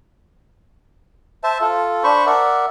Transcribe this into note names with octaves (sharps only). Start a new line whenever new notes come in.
C5 E5 A5
F4 A4
D4 C5 B5 C#6
A#4 D5 E5 F#5